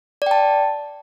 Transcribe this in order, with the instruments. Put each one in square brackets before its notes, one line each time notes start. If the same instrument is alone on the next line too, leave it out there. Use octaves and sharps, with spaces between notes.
[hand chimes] D5
G5
A5